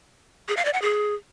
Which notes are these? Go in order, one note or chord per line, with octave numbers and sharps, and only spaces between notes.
G#4
F5
D5
F#5
G#4